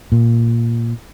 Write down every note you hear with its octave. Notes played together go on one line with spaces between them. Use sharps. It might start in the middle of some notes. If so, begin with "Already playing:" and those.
A#2